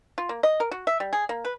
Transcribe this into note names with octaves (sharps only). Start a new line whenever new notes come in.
F4
A#3
D#5
A#4
F#4
E5
G3
G#4
A#3
B4